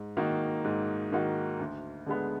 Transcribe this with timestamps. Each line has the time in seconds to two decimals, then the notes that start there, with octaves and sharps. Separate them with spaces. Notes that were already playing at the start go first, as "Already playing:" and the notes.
Already playing: G#2
0.17 D#3 A#3 D#4 F#4
0.64 G#2
1.12 D#3 A#3 D#4 F#4
1.59 D2
2.06 D3 G#3 B3